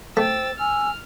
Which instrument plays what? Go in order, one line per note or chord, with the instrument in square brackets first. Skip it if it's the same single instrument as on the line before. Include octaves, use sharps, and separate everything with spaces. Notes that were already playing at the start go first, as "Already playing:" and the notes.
[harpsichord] A3 [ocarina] C5 [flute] G5 [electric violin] E6 A6
[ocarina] G#5 [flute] E6 [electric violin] F6